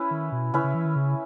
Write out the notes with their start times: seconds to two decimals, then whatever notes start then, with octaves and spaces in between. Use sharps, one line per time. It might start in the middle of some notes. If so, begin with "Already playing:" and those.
Already playing: C#4 E4 B4
0.11 D#3
0.32 B2
0.54 C#3 C#4 E4 B4 E5
0.64 C#3
0.75 E3
0.85 D#3
0.96 C#3